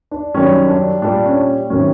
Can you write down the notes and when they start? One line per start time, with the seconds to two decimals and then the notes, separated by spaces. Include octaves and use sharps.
0.11 D4
0.34 F#2 D#3 G3 C#4
0.68 D4
1.02 A#2 G3 D4
1.25 C#4
1.70 C3 D#3 F#3 C#4